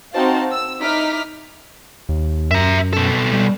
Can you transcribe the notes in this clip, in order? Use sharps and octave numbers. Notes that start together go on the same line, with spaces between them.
C4 D#4 F#4 C5 F5 A5
E6
D#4 E4 D6 D#6 F6 B6
D#2
F#2 E5 A#5
B2 A4
G3